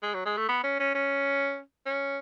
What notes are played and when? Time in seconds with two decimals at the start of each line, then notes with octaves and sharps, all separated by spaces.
0.02 G#3
0.14 F#3
0.26 G#3
0.37 A3
0.48 B3
0.64 C#4
0.80 C#4
0.95 C#4
1.86 C#4